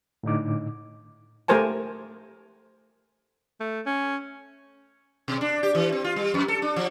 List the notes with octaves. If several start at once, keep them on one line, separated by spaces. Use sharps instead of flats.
A2 D3 D#4 D6
A3 G4 A#4 C5 G#5 A5
A3
C#4
B2
D4
G4
E3
C4
F4
G3
F2
A4
D4
F3